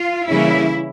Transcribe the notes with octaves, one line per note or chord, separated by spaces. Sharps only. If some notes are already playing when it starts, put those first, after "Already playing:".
Already playing: F4
C#3 E3 G3 A#3 C#4 E4